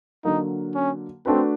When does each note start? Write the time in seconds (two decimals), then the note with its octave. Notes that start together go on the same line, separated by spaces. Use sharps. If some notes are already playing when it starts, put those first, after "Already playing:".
0.24 D3 F#3 A#3 D#4
0.75 C#4
1.26 A3 C4 D4 F#4 B4